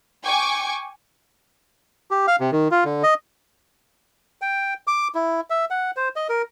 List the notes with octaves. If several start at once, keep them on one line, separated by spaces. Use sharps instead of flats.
G5 G#5 C#6 D6
G4
F5
C3
D#3
F4
D3
D#5
G5
D6
E4
E5
F#5
C5
D#5
A#4